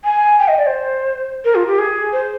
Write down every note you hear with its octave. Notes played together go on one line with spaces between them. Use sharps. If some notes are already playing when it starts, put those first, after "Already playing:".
G#5
G5
D#5
D5
C5
A#4
F4
G4
G#4
C5